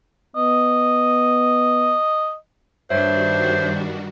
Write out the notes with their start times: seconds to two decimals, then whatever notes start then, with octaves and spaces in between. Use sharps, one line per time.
0.36 B3 D#5
2.90 G2 D#3 G3 D4 F#4 C5 C#5 E5